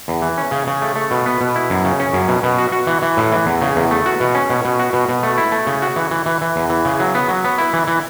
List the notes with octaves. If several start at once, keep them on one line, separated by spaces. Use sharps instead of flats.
E2
E3
C#4
C#3
C#3
A3
A3
B2
B3
B2
E4
F#2
C#3
C#4
F#2
B2
B2
F#4
F#4
E3
E3
A2
E3
E2
C#3
E2
A3
F#4
B2
C#4
B2
B2
F#4
B2
B2
A3
E4
A3
C#3
F#4
E3
E3
E3
E3
E2
E3
C#3
F#3
B3
F#3
B3
E4
E3
E3